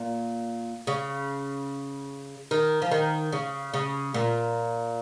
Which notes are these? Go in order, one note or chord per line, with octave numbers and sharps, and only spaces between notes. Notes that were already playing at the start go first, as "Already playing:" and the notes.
Already playing: A#2
C#3
D#3
F3
D#3
C#3
C#3
A#2